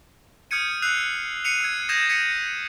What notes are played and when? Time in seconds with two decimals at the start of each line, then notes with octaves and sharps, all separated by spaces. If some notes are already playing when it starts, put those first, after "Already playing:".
0.51 D#6 F6 G6 G#6 C#7 D#7
0.82 E6 F#6 C7 D#7 F7
1.45 C7 C#7 D#7 F7
1.61 E6 G#6
1.89 D#6 G6 G#6 A#6 D#7 E7
2.09 G#6 B6 C#7 D#7 E7